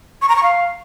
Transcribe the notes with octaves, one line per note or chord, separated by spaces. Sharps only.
C#6
A#5
C#6
F5